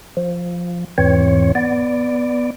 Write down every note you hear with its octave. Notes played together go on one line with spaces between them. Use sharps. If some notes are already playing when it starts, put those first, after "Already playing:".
F3
E2 G#2 E3 C4 C#5
B3 D5